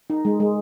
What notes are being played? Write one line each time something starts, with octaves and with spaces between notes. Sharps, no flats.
D#4
G#3
G#3